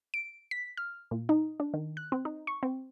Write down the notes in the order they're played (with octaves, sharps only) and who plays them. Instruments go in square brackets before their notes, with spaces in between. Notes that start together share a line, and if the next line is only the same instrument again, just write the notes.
[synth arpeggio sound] D7
B6
F6
A#2
D#4
D4
D#3
F#6
C4
D#4
C#6
C4